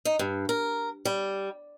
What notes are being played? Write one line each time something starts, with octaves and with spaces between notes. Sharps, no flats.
D#4
G2
A#4
G3